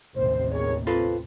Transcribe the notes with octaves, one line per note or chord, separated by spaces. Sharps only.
A1 D#2 C3 C5
G#4 A#4 C#5
C4 F4 A4 B4